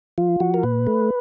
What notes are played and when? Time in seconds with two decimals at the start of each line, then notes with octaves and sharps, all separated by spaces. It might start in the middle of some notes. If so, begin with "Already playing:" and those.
0.18 F3 F4
0.40 F3 F#4
0.54 A#4
0.63 A#2 B4
0.87 A3